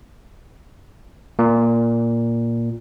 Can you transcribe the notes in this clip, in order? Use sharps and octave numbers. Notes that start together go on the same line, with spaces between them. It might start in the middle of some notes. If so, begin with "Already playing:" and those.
A#2